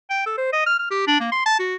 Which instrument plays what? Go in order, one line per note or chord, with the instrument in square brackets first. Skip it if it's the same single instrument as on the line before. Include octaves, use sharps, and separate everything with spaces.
[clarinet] G5
A4
C5
D#5
F6
F6
G4
D4
A#3
C6
A5
F#4